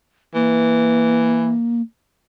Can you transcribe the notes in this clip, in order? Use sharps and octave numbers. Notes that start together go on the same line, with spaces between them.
E3 A#3